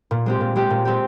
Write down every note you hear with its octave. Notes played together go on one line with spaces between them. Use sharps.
A#2
G#3 C4 G4
A#2
G#3 C4 G4
A#2
G#3 C4 G4